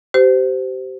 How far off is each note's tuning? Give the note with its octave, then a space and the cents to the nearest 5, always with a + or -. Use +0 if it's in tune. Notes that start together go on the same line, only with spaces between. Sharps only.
G4 -30 C5 -20